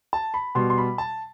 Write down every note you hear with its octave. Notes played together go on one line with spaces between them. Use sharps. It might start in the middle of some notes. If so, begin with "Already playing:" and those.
A5
B5
B2 G3 C6
C6
B5
A5